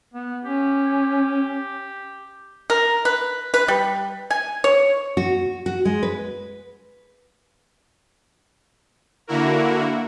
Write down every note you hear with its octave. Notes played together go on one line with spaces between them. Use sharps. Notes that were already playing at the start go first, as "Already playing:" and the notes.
B3
C#4 G4
A#4
B4
B4
G3
G#5
C#5
F#4
F#4
G#3
B4
D3 A#3 E4 F#4 A#4